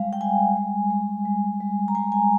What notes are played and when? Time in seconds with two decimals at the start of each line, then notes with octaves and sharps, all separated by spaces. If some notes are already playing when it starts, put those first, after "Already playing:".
Already playing: G3 G#3 F5
0.13 G5
0.21 G3 G#5
0.56 G#3
0.90 G#3
1.25 G3
1.60 G3
1.88 A#5
1.95 G#3 G#5
2.12 G#5